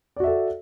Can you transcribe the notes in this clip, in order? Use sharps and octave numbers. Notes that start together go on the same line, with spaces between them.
F#4 A4 D5 E5